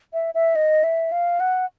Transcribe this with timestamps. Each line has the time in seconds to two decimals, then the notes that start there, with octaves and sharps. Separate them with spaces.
0.13 E5
0.34 E5
0.55 D#5
0.83 E5
1.12 F5
1.40 F#5